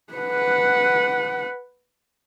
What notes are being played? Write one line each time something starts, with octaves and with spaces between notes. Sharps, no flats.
B4 F#5